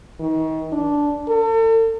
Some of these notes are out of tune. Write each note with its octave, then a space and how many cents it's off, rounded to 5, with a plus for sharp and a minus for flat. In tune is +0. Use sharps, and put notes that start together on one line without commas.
D#3 +35
D4 -10
A4 +40